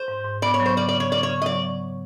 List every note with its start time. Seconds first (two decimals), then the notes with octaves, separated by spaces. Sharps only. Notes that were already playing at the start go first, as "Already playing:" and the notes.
Already playing: C5
0.08 G#2
0.25 G#2
0.42 B3 D5
0.54 C#5
0.60 F#3
0.66 C5
0.77 C#3 D5
0.89 D5
0.94 C#3
1.00 C#5
1.12 C#3 D5
1.23 C#5
1.29 C#3
1.42 D#5
1.46 F#3 D5